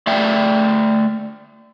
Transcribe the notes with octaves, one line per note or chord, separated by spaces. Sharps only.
A3 D5 E5 G5